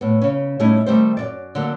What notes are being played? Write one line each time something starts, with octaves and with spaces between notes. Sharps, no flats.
A2 B3
C#3 C#4
A2 G3 A3 C#4 D#4 E4
D#3 G3 A3 C4 C5
F#2 D#3 D5
D3 F#3 A#3